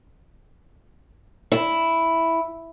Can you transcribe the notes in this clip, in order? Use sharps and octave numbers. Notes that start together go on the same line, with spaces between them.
E4